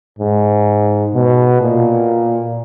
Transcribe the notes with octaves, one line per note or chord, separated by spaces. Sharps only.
G#2
B2
A#2